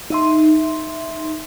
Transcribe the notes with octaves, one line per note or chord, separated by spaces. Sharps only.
D#4 E5 C6